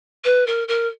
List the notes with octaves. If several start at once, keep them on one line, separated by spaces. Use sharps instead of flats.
B4
A#4
A#4